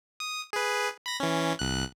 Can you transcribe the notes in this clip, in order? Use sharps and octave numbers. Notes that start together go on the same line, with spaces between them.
D#6
G#4 B4
B5 A#6
E3 C#4
C2 F#6